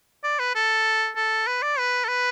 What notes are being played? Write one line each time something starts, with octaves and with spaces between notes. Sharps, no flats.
D5
B4
A4
A4
B4
D5
B4
A4
B4